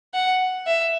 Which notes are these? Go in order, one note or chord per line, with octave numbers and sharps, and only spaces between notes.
F#5
E5